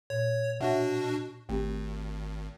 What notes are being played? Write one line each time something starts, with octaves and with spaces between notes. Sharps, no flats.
A#2 C#5
B2 D4 F#4 C#5 E5 F#5
G#1 A3 C4 G4